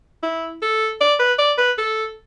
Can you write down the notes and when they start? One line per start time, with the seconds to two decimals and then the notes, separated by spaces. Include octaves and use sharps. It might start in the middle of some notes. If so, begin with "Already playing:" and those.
0.23 E4
0.62 A4
1.01 D5
1.19 B4
1.39 D5
1.58 B4
1.78 A4